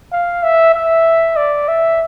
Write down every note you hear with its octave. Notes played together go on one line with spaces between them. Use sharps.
F5
E5
E5
D5
E5